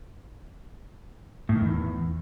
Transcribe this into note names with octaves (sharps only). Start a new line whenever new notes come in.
A2
D#3
E2